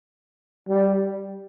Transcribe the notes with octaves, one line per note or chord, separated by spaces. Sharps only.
G3